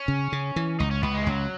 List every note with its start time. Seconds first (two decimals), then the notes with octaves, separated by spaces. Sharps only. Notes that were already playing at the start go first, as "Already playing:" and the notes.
Already playing: C#4
0.08 C#3
0.32 C#3
0.56 E3
0.79 C#2 D#4
0.91 C#4
1.03 C#2 B3
1.14 G#3
1.22 E3
1.26 C#2 F#3